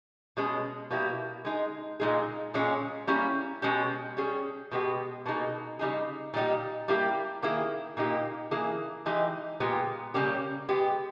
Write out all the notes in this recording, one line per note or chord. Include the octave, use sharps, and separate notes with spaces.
B2 G#3 C#4 G#4
B2 G3 A#3 E4 G4
G#3 D#4 G#4
A#2 G#3 D#4 G#4
A#2 G#3 C#4 G#4
G3 A#3 C#4 E4
B2 G#3 C#4 G4
G3 C#4 G#4
B2 G#3 B3 G4
B2 A#3 D#4 G#4
C#3 G3 A#3 D#4 G#4
A#2 G3 B3 D#4 G4
G3 A#3 E4 G4
D#3 A#3 E4 G#4
A#2 A#3 D#4 G4
E3 A#3 E4 G#4
E3 G#3 D#4 G4
A#2 G#3 B3 G4
C#3 G3 A#3 C#4 G4
G#3 B3 G4